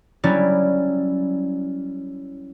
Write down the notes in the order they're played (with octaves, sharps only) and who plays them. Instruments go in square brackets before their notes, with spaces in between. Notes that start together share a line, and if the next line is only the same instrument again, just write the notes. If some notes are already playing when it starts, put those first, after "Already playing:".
[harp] F#3 G3 C#4 E4 D5